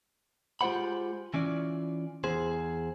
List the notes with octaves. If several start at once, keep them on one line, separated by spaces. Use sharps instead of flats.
G#3 F4 G4 C5 F#5 B5
E3 C#4 F4 D5
E2 G#4 C5